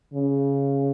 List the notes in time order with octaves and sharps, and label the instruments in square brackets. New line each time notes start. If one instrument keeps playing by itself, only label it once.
[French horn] C#3